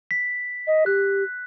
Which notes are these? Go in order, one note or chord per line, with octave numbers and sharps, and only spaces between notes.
B6
D#5
G4 F#6